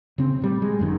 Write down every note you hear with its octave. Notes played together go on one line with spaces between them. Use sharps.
C#3 C4
A2 G3
G#3
G1 F#2 A2 D#3